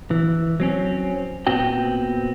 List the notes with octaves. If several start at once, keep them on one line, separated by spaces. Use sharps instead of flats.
E3
F#3 C4 C#4
A#2 B3 C4 F#4 G5